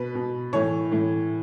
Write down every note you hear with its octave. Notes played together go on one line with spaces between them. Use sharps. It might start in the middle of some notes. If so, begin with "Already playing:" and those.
Already playing: B2 B4
B2
A2 E3 C#5
A2 E3